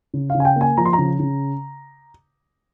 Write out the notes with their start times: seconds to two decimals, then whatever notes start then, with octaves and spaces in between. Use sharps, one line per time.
0.14 C#3
0.30 C#3 F5
0.40 G#5
0.45 G5
0.56 A#3 G#5
0.77 F3 A#5
0.85 C6
0.93 A#5
0.98 C#3
1.20 C#3